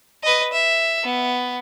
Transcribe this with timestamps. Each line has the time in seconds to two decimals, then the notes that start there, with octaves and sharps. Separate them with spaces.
0.24 B4 D#5
0.53 E5
1.04 B3